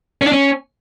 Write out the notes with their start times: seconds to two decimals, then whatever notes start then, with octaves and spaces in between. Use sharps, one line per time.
0.22 C#4
0.27 D4
0.32 C#4